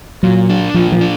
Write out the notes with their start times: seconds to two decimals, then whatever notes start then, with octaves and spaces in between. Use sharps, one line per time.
0.23 A#2 F#3
0.50 D4
0.74 A#2 F3
0.92 F3
1.01 D4